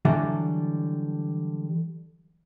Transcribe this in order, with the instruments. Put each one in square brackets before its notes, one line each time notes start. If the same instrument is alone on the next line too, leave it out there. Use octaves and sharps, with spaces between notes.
[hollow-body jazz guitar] D3 E3 F#3 G3 A4